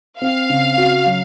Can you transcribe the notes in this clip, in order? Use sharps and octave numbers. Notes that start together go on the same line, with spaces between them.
C4 F5
C#3
F#4
F#3